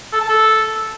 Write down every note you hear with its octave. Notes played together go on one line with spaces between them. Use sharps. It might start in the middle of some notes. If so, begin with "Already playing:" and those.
A4
A5
A4